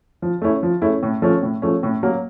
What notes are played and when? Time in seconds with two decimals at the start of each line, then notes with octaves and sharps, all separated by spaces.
0.22 F3
0.42 A3 C#4 E4
0.63 F3
0.82 A3 C#4 E4
1.03 A2
1.22 F3 A3 C#4
1.43 A2
1.62 F3 A3 C#4
1.83 A2
2.03 F#3 A#3